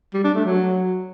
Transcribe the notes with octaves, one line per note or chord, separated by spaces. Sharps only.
G3
D4
A3
F#3